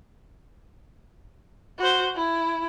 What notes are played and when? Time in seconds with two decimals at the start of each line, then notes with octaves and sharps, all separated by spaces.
1.78 F#4 C5
2.16 E4